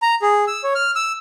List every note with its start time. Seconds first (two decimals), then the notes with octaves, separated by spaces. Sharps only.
0.02 A#5
0.22 G#4
0.47 E6
0.64 C#5
0.75 F6
0.96 E6